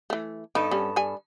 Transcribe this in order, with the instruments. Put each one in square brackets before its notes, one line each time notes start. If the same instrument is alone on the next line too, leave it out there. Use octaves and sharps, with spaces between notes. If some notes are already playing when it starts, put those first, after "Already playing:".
[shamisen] E3 A3
[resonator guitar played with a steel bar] G2 B3 A4 [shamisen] D#4
[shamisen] G3 C#4
G3 G#5